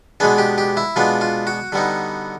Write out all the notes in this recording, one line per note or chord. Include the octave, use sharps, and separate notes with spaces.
B2 G#3 B3 D4 G#4
G4
G4
E4
B2 G#3 B3 D4 F4
F4
F#4
D3 G3 B3 D#4